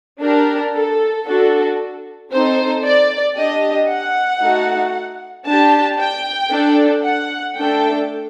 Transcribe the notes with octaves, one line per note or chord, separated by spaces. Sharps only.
D4 G4 A#4
A4
D4 F#4 A4
C4 D#4 A4 C5
D5
D4 G4 D#5
F#5
A3 D#4 F#4 A4
D4 G4 A5
G5
D4 A4
F#5
A3 D4 A4 G5